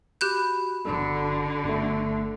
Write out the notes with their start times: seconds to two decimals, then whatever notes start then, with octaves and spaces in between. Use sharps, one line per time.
0.21 F#4 G4 B5 F#6 G6
0.85 G1 D3 D4 A4
1.64 G1 A3